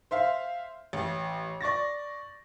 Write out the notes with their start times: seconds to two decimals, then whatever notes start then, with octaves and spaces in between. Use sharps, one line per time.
0.11 C5 E5 F5
0.93 A1
1.61 D5 C#6 A6 A#6